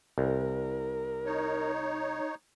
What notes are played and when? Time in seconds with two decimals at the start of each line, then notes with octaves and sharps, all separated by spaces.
0.18 C2 A#4
1.25 D#4 C#5